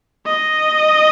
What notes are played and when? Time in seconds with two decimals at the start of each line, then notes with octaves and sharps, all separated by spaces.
0.26 D#5